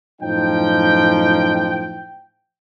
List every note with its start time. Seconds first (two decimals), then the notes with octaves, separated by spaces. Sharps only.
0.21 F#2 A2 F3 D#4 G5